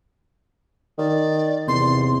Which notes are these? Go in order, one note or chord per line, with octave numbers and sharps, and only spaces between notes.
D#3 D5
E2 C3 C6